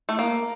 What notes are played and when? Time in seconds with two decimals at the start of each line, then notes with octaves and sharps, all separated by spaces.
0.09 A3
0.19 A#3